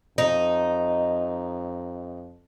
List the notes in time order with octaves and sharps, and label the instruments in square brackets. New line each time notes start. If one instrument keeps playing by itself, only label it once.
[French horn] F2 [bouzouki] D#4